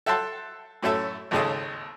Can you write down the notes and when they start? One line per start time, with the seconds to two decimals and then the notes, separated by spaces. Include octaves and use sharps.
0.06 A4 E5 F#5 G5 A5 C6
0.83 F#2 A2 A3 C#4 A4 E5
1.31 G#1 D#2 C#3 G#3 A4 D#5